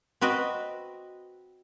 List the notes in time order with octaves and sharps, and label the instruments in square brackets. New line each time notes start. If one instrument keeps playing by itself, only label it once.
[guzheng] C4 F#4 B4 D#5 B5